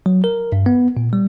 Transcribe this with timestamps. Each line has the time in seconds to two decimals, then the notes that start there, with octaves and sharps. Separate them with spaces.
0.06 F#3
0.24 A#4
0.52 G2
0.66 B3
0.97 A#2
1.13 G3